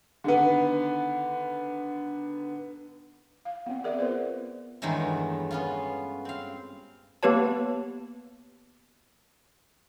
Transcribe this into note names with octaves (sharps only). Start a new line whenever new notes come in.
D3 D#3 B3
F5
B3 C4
G#4 A#4 D5 E5
B3 F4 B4 C5
E2 G2 D#3 F#3 G#3 A3
B3 C#4 F4
C4 F5
A#3 B3 G4 B4 C#5 A5